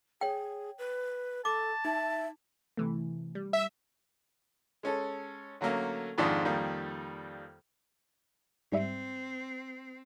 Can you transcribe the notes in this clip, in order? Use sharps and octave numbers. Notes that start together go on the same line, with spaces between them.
G#4 C#5 G5
B4
A4 A5 D6
D#4 E5
C3 E3 A3
G3
E5
G#3 C#4 A4
D3 F#3 A3 A#3 C#4
F2 G#2 D#3 F3 D4 F4
F2 D#3 G3 A#3
G#2 G3 C4 E5